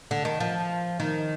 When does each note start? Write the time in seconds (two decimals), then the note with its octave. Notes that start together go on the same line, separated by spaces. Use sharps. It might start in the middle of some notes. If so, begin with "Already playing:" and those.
0.11 D3
0.25 D#3
0.40 F3
1.00 D#3